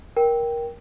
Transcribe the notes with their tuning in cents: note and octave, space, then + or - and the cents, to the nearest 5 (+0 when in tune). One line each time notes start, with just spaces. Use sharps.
A#4 +15 G5 +0